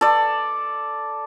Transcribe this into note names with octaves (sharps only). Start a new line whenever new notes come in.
A4 D5